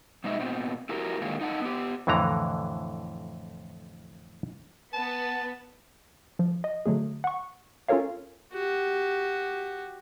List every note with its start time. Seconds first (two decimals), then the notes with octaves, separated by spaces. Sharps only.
0.24 B2 G#3 D#4 D#5 E5
0.39 A#2 B3 C4
0.89 E4 F#4 G4 A#4
1.21 A#2 D3 D#3 F#3 G#3 A#3
1.41 D#4 D#5 F#5 G5 A5
1.61 B3 G4
2.07 F2 A2 D3 E3 A#5
4.93 B3 A5
6.39 F3
6.64 D#5
6.86 D3 F#3 A3 G#4
7.24 F#5 C#6
7.88 C#4 F4 A4 A#4 C#5 F5
8.53 F#4 G4